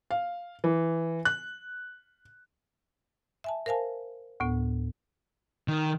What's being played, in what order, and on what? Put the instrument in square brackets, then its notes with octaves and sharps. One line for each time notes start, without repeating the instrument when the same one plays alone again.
[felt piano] F5
E3
F#6
[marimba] E5 G#5 A5
A#4 C5 F5 G#5 A5
D2 A2 B3
[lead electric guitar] D#3